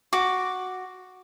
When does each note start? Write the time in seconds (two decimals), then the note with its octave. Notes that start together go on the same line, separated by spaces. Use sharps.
0.13 F#4 D6